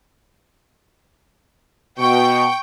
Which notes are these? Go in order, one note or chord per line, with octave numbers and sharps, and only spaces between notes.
B2 G5 C#6